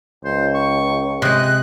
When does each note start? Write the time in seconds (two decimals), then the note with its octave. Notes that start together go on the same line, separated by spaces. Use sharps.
0.25 C#2 C5
0.54 C#6
1.22 C3 G#3 D#5 F#6